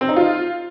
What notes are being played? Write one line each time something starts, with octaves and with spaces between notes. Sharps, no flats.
C4
D#4
F4